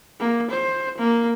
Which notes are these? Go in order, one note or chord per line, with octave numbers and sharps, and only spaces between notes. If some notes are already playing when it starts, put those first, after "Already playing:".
A#3
C5
A#3